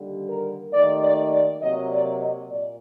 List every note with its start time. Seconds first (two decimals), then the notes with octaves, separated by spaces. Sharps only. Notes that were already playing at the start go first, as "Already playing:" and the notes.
Already playing: D#2 D3 G3
0.28 A#4
0.72 D#2 D#3 A3 D5
1.02 D5
1.31 D5
1.61 C3 F#3 A#3 D#5
1.91 D5
2.20 D#5
2.49 A#2 D5